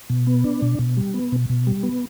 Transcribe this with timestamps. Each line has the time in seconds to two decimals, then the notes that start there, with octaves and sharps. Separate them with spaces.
0.10 B2
0.27 B3
0.44 D4
0.62 B2
0.79 B2
0.97 G3
1.14 B3
1.32 B2
1.50 B2
1.67 G3
1.83 B3